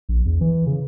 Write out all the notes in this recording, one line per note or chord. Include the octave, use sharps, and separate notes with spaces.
A#1
E2
E3
C#3